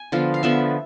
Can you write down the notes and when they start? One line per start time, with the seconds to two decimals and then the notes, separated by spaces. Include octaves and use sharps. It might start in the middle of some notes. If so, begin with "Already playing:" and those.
Already playing: G#5
0.12 D3 F3 B3 F5
0.34 F5
0.43 D3 F3 B3 E5